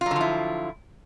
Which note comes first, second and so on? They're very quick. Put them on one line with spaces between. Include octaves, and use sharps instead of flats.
F4 F#3 D3 F3 E4